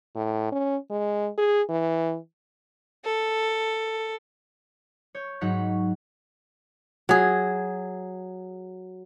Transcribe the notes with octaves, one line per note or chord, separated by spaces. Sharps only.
A2
C#4
G#3
G#4
E3
A4
C#5 G6
G#2 F#3 D#4 F#5 F#6 B6
F#3 G#4